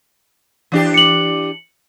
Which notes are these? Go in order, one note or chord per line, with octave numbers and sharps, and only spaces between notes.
E3 D4 G4
C#7 F#7